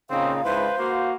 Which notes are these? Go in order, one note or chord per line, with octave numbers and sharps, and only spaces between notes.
A#2 C#3 C4 D#4 F5
C#2 G#2 E4 B4 C5
A#3 F#4